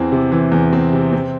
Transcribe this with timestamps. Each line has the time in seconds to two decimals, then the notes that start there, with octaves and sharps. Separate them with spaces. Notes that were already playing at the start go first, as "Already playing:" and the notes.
Already playing: E2 E3 C4
0.12 C3
0.32 E3
0.52 E2
0.73 C4
0.93 C3
1.12 C4